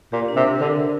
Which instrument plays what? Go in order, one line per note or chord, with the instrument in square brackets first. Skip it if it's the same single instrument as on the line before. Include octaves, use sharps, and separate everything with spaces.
[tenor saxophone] A#2 [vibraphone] G4
[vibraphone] D4
[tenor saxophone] C3
[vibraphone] A#4
[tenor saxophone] D3 [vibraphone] A#4
[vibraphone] D4